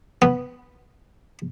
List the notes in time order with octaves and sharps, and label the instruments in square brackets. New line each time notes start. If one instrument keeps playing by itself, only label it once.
[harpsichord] B3